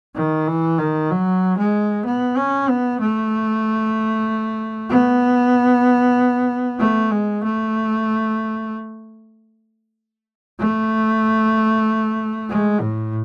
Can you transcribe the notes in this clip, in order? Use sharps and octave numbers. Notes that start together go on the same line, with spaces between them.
D#3
E3
D#3
F#3
G#3
B3
C#4
B3
A3
B3
A3
G#3
A3
A3
G#3
A2